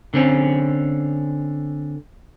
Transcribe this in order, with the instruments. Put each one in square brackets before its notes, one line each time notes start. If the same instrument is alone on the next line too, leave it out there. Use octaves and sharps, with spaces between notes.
[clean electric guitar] D3 C4 C#4